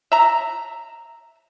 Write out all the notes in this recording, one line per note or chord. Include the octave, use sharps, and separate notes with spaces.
E5 A#5